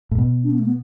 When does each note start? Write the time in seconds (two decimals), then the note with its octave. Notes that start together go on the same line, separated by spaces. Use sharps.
0.11 A2
0.18 B2
0.44 D4
0.51 B3
0.59 A3
0.66 B3